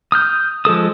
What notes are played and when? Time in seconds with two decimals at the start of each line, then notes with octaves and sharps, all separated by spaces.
0.12 D#6 F6 G6
0.65 F3 G#3 A4 D#6